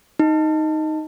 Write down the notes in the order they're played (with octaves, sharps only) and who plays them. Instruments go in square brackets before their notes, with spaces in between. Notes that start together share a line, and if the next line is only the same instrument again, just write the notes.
[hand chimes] D#4